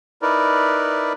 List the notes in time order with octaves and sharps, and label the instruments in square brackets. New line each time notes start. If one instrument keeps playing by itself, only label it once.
[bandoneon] D#4 E4 A#4 B4 D5